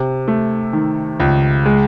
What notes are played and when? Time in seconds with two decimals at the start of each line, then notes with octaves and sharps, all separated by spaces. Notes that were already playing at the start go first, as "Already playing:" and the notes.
Already playing: C3
0.28 A3
0.73 D#3
1.20 C#2
1.65 G#3